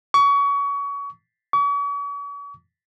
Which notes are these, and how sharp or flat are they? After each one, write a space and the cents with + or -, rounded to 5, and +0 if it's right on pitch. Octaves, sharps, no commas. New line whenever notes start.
C#6 +30
C#6 +45